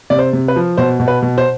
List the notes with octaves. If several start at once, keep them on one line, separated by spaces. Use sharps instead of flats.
C3 D5
C5
C3
B4
F3
B2 C5
B2
B4
B2
C5